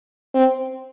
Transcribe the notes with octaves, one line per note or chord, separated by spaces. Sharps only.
C4